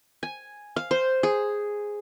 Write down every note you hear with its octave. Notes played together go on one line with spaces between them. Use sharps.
G#5
F5
C5
G#4